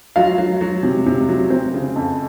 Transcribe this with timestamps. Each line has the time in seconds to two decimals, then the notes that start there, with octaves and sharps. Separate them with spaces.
0.16 F#3 F4 F5
0.38 F#3
0.61 F#3
0.83 C3
1.06 C3
1.29 F#3
1.50 C4
1.74 C#3
1.96 F2